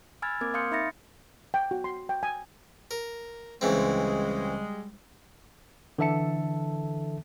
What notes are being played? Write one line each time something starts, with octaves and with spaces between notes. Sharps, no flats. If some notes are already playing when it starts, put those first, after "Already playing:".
G#5 B5 E6 F6 G#6 A6
A#3 C4 A#4 D6 G#6
F5 C6 D#6 F6 G6 C#7
D#4 E5 B5 A6 A#6 C#7
G5
F#4
C6
G5
G#5
A#4
C#2 E3 G3 G#3 C4
D3 E3 A4 E5 A5 C#7